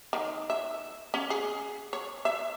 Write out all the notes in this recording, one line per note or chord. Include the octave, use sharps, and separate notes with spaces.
D#3
E5
C#4
G#4
C#5
E5